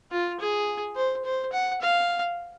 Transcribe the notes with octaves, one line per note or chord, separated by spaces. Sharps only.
F4
G#4
C5
C5
F#5
F5